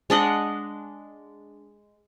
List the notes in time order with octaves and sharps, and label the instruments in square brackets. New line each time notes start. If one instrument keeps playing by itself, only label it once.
[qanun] G#3 D4 D#5 F#5